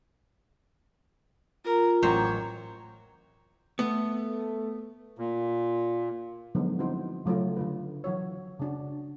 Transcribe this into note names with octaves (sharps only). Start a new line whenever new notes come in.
F4 A#4
A1 F#3 C5 C#5 G5 A#5 D6
A3 B3
A#2
D3 F3 F#3 G#3 B3 D#4
G3 C4 D#4 E4 F#4 C5
C#3 F#3 A3 F4
D3 F4 B4
E3 F#3 F#4 C#5
C#3 D4 F#4